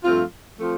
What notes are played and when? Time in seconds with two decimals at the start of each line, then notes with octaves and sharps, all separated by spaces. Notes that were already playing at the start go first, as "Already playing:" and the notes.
0.04 G2 F3 A3 C4 F4
0.60 F3 A3 C4 F4